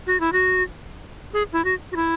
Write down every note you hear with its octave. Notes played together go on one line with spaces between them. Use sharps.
F#4
E4
F#4
G#4
E4
F#4
F#4
E4